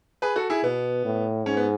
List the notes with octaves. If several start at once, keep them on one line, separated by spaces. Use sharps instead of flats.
G#4 B4
F#4 A4
E4 G#4
B2 B3
A2
G#2 C#4
B3